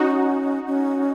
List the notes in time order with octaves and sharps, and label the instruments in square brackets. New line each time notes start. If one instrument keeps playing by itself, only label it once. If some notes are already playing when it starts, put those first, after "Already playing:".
Already playing: [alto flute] C#4 [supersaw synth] D#4 F#4
[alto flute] C#4